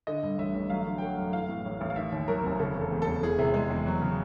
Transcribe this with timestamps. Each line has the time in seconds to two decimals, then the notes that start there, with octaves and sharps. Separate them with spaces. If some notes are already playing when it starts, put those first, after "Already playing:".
0.07 D3 D#5
0.23 G2
0.38 A1 E5
0.55 A1
0.70 F#3 F5
0.86 D3
0.98 G5
1.02 A3 F#5
1.18 F#2
1.33 E3 F5
1.49 A2
1.65 A1
1.81 A1
1.90 F5
1.96 D#3 E5
2.12 D#2
2.28 F#3 A#4
2.44 F1
2.59 C#3 A4
2.75 E2
2.81 A4
2.92 E1
3.02 E1 A4
3.22 E3 G#4
3.39 C3
3.54 G#3
3.70 E2
3.86 F#3
4.01 C#3